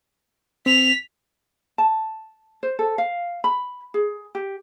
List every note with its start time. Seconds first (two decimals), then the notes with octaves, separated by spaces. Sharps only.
0.66 C4 B6 F7
1.78 A5
2.63 C5
2.79 A4
2.98 F5
3.44 B5
3.94 G#4
4.35 G4